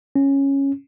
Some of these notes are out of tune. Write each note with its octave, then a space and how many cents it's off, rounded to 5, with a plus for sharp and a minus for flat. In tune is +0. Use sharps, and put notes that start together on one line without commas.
C#4 -10